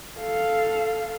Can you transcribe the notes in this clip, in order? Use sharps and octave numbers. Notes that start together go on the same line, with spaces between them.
A4 F5